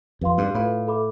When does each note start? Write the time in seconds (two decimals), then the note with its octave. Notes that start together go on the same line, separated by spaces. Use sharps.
0.21 F2 G4 B4 F5 C6
0.38 G2
0.55 A2 F4 B4 F5 B5
0.87 A4 E5 B5 D6